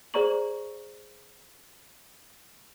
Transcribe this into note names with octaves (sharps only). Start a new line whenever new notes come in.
G#4 C5 D5 A#5 C#6 F#7